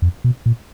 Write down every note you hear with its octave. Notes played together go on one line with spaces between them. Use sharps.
F2
B2
A#2